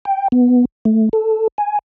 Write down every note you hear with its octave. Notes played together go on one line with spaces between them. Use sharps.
G5
B3
A3
A4
G#5